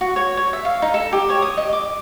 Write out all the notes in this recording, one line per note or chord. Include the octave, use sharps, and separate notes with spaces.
F#4
C#5
C#5
E5
F5
D#4
A4
G4
C#5
D#6
D#5
D6